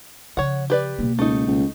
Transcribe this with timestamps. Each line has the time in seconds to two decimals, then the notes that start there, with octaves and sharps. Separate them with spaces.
0.37 C#3 F3 C#5 F#5
0.70 G4 B4 D5
0.99 B2 A#3
1.19 C#2 A3 D#4
1.47 C#2